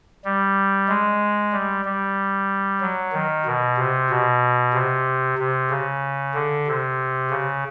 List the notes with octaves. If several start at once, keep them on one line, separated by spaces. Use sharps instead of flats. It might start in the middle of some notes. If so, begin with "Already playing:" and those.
G3
G#3
G3
G3
F#3
D#3
B2
C3
B2
C3
C3
C#3
D3
C3
C#3